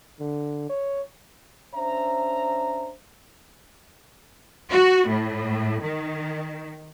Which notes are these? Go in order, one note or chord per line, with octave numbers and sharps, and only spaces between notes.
D3
C#5
C#4 D4 C5 E5 A#5
F#4
A2
D#3